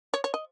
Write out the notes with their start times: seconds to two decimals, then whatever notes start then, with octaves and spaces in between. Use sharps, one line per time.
0.14 C#5
0.24 C#5
0.34 D#5